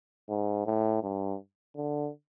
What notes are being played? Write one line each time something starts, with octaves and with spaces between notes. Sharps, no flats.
G#2
A2
G2
D3